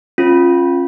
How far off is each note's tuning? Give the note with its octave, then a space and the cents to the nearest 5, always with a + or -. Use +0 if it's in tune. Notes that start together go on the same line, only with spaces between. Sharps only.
C#4 -30 F4 +0